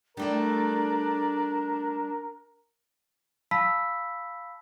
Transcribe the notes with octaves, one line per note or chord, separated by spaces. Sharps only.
G3 A3 D4 E4 A#4
F5 A5 B5 E6 B6